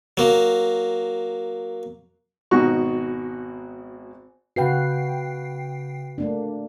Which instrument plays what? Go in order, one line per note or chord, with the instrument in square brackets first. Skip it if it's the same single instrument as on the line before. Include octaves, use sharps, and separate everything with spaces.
[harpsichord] F#3 A#3
[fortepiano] G#1 B2 D#4 F#4 C#6
[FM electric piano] C#3 G5 C7 [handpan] F#4 B4 F5
[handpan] A3 A#3 D4